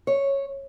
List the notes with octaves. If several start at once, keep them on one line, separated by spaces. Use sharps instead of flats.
C#5